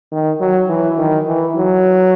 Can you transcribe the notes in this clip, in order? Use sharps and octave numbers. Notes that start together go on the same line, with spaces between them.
D#3
F#3
E3
D#3
E3
F#3